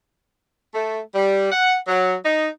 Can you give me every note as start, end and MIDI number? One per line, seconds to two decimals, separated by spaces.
0.74 0.99 57
1.14 1.49 55
1.52 1.76 78
1.87 2.14 54
2.25 2.48 63